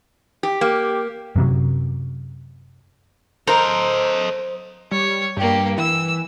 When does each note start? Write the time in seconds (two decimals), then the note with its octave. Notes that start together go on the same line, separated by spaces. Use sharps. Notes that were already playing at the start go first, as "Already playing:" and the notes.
0.43 G4
0.61 A#3 G4
1.36 F#2 C3 F#3
3.47 A4 A#4 C5 D#5 A#5
4.91 G3 C#5
5.37 G2 A#3 G4
5.78 E3 E6